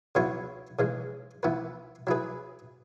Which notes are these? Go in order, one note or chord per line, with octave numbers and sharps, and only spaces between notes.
C#3 F#3 B3 E4 C#5
C#3 E3 G#3
E3 B3 E4 B4
F#3 E4 G#4 B4